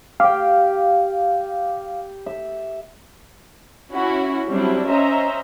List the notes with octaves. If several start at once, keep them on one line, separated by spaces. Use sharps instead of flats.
G4 F5 G5
E5
C#4 E4 F#4
F#3 G3 C4 D4 E4
C#4 C5 D#5 E5 A#5